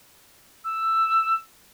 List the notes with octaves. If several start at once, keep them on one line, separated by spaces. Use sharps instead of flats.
E6